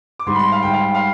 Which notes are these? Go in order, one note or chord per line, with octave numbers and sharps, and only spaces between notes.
D6
G#2 G3 C6
B5
C6
F5
G#2 G3 G5
F5
G5
F5